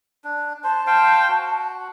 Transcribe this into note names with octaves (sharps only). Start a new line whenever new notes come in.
D4
C5 A5
C5 F5 G5
F#4